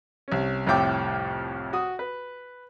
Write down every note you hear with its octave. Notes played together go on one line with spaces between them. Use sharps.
C2 C#4
C2 F2 A2 E5 G5 D6
F#4 D#6
B4